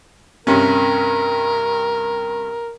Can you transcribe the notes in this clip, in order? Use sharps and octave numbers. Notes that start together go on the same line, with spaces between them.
G2 C3 C#4 A#4